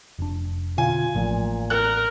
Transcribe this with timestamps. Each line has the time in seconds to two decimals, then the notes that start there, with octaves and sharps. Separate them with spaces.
0.19 F1 D4
0.78 B2 D3 F4 G#5
1.15 A1 A#2 F3 A3
1.70 A#4 F#6